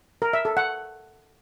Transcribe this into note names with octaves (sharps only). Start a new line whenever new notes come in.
A#4
E5
A4
F#5